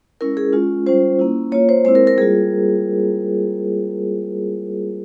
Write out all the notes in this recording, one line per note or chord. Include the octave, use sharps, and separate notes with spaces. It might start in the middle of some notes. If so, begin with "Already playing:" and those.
G#3 C#4 E4 A#4
G#4
G#3 C#4 F4
G3 C#4 F4 C5
A#3 C#4 E4
A#3 F4 C#5
C5
G#3 C4 E4 C5
A#4
A#4
G3 A#3 F4 G#4